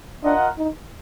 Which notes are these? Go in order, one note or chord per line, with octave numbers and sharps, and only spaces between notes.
D4 F4 A#4 D#5 F#5
D#4